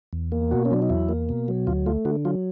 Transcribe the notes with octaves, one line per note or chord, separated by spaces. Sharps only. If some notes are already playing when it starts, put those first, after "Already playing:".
E2
A#3
B2 F#4
C#4
F#3 D4
D#4
E2 E4
A#3
B2
F#3
D2 F4
A3 F4
D3 F#4
F#3 F4